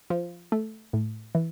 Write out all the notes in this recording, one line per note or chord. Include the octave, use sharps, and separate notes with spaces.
F3
A3
A2
E3